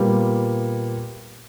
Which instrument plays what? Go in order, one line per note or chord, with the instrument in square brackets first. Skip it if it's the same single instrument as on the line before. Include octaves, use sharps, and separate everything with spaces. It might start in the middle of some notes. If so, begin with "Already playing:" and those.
Already playing: [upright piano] A#2 G3 B3